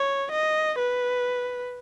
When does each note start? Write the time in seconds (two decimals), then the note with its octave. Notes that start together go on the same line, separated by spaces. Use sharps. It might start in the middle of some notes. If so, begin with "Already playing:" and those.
Already playing: C#5
0.32 D#5
0.78 B4